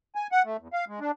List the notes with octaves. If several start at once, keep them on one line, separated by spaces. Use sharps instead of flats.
G#5
F#5
A3
E2
F5
G#3
D4